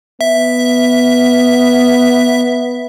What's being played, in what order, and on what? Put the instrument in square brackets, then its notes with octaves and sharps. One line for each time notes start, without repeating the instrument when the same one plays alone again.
[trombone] B3 [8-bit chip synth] E5